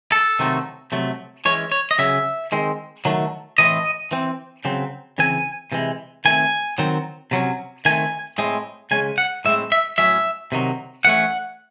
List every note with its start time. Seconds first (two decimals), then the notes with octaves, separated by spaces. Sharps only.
0.12 A4
0.39 C3 D#3 F#3 A3 C4
0.92 C3 F#3 A3
1.45 E3 G#3 C#4 C#5
1.72 C#5
1.91 D#5
1.98 C#3 F#3 C#4 E5
2.52 D#3 G#3 C4
3.05 D#3 F#3 A3
3.58 A2 E3 C4 D#5
4.11 E3 C4
4.65 C#3 F#3 C4
5.18 C#3 E3 C4 G#5
5.72 C3 E3 G#3
6.25 D#3 A3 C4 G#5
6.78 D#3 F#3 C4
7.31 C3 F#3 C#4
7.85 D#3 A3 C4 G#5
8.38 A2 G#3 C4
8.91 C#3 G#3 C#4 G#5
9.18 F#5
9.45 A2 G#3 C4 E5
9.72 E5
9.98 A2 F#3 C#4 E5
10.52 C3 D#3 F#3
11.05 E3 A3 C#4 F#5